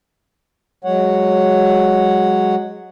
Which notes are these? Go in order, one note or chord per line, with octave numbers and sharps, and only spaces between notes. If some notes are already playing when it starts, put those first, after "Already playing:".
F#3 G#3 C#5 F#5